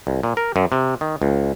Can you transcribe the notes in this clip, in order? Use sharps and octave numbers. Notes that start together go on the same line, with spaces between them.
C2
A#2
A#4
F#2
C3
D#3
C#2